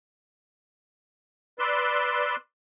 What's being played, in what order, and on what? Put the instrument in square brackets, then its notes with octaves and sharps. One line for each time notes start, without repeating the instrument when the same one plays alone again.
[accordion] B4 D5 C6 E6